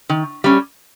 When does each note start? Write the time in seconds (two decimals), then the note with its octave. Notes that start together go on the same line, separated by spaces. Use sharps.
0.09 D#3
0.44 G3 C#4